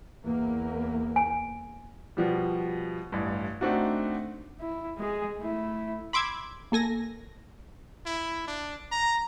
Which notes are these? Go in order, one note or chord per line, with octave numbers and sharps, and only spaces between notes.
E2 A#3
G#5
B2 F3 G3
A1 G2
A3 C4 D4 D#4 F#4
E4
G#3 G#4
A3 E4
B5 C6 D6 E6 G#6
A#3 A4 G#5 A#6
E4
D4
A#5